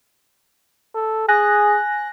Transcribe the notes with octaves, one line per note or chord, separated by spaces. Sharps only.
A4
G#4 G#5 F#6 A#6